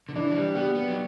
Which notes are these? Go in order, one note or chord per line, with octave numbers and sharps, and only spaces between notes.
D3
E3 D4
F#3
G3
B3 G4
B3
F#3